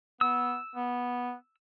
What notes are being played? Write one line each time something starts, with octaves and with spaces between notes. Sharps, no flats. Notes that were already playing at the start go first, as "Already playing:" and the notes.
B3 E6
B3